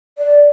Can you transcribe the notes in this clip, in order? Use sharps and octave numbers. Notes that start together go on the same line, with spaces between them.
D5